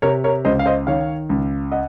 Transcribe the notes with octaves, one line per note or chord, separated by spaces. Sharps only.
C3 A#4 C#5
A#4 C#5
C#2 C5 D#5
F5
C5 D#5
D#3 C#5 F5
C#2
D#5 F#5